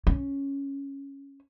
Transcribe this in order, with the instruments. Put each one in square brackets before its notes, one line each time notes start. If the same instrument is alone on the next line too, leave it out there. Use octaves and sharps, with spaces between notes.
[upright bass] C#4